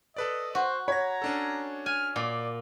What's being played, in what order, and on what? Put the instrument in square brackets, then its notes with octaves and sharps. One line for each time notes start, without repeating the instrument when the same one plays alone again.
[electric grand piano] A4 B4 D5 [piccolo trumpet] D#5
[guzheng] F#4 [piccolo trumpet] C5
[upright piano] C#5 [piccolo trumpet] A#5 [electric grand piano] B5 A#6
[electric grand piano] C#4 D4 A4
[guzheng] G#5 [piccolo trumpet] F6
[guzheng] A#2 [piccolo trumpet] D5